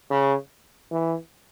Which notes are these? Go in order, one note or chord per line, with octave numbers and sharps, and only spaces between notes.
C#3
E3